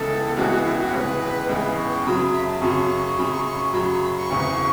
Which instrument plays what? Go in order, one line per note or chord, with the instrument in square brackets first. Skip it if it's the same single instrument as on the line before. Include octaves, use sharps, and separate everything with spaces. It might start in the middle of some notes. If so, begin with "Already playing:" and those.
Already playing: [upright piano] C#2 C#3 E3 B3 [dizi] A4
[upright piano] C#2 C#3 E3 B3 [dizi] F#4
[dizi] F#4
E4
F#4
[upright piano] C#2 C#3 E3 B3 [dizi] B4 C#5
[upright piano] C#2 C#3 E3 B3 [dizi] B5
[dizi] C#6
[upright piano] F#2 C#3 F#3 [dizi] B5
[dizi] E5
A5
[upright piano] F#2 C#3 F#3 [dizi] C#6
[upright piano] F#2 C#3 F#3 [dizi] B5
[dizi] C#6
C#6
[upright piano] F#2 C#3 F#3 [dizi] B5
[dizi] C#6
B5
C#6
[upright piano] F#1 E2 C#3 E3